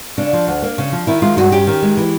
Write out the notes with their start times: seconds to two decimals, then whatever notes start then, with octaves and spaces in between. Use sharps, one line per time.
0.18 C#3 D4
0.33 F3
0.47 D2
0.62 A#3
0.78 C#3
0.92 F3
1.07 D#3 E4
1.22 G#3 F4
1.37 G2 F#4
1.52 C#4 G4
1.67 D#3
1.82 G#3
1.97 E3